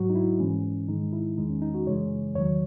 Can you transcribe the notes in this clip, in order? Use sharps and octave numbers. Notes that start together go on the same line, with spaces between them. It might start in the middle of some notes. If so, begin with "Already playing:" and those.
Already playing: G#2 F#3 F#4
D#4
E4
G#2 E3 G#3 C#4
G#2 D#3 G#3 D#4
E4
E2 D#3 G#3 D#4
C#4
D#4
F#4
F#2 C#3 E3 G#3 C#5
E2 D#3 F#3 C#5